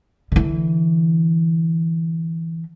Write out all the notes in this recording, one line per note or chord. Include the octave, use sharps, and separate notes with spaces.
D3 E3